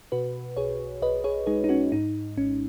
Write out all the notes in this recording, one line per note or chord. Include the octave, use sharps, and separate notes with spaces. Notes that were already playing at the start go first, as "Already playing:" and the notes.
B2 F#4 B4
B1 G#4 C#5
B1 B4 D#5
G#4 C#5
G#3 D#4 G#4
D#4
C#4 F#4
G#2 D#4
G#1 C#4